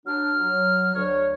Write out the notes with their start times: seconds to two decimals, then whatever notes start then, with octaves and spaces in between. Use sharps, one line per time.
0.06 F#3 D4 F6
0.38 F#3
0.95 D2 C#5